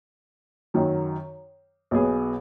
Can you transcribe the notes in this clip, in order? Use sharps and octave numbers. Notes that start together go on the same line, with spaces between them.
F#2 D#3 F#3
B1 B2 B3 G#4